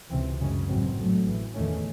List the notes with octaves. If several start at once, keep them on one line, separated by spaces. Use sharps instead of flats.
C#2 C3 E3 C4
F#2 C#3 G#3 C#4
A1 G#2 F#3 C4
A1 G#2 F#3 A3
A1 A2 E3
E2 D#3 A3 C#4